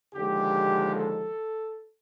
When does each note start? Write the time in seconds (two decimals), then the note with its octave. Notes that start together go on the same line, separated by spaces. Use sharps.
0.14 D#2 D3 F3 G#3 G4
0.95 A4